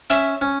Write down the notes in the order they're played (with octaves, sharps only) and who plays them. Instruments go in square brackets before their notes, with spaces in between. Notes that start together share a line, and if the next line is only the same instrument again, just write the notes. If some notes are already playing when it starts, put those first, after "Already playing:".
[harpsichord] C#4 [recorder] E5
[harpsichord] C#4